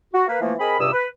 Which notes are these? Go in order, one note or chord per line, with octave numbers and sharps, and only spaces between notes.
F#4
A#3 B4 F5
E3 F3 A3 A#3
C4 G#4 A#4 D#5 B5
C#2 G2 C3 G4 D#6 E6
B4